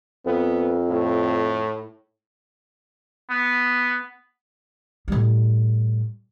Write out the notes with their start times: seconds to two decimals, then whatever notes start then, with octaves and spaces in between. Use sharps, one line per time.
0.26 F2 B3
0.89 A2
3.30 B3
5.08 A2 G3